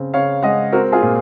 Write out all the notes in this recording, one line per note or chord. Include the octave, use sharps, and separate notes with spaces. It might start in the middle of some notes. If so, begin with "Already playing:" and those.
Already playing: C#3 C4
C#3 C#5 F5
G#3 D#5 F#5
C4 F#4 A#4
F4 G#4
A#2